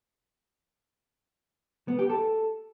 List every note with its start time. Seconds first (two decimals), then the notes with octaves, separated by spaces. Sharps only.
1.88 B3
1.99 G4
2.10 A4